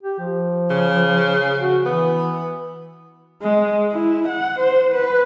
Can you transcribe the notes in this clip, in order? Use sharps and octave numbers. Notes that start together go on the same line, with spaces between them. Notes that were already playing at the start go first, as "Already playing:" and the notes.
G4
F3
C#3
F#4
E3 B3
G#3
E4
F#5
C5
B4